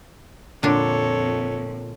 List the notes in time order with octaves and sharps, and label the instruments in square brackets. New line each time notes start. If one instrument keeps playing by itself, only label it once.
[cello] F2 [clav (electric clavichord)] A#2 [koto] D3 D4 [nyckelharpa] A4 C#5